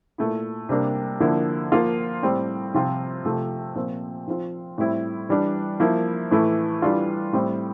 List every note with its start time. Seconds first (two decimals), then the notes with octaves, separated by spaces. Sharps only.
0.18 A#2 A3 E4
0.69 C3 G3 A#3 D4
1.20 D3 F3 A#3 E4
1.72 F3 A#3 F4
2.23 A2 G3 C4
2.74 C3 F3 C4 F4
3.25 C3 F3 A3
3.76 A#2 F3 C4
4.27 F3 C4 F4
4.78 A2 G3 C4 E4
5.29 E3 G3 D4
5.80 F3 A#3 E4
6.31 A2 E3 A3 E4
6.82 E3 G3 D4 F4
7.33 A2 G3 C4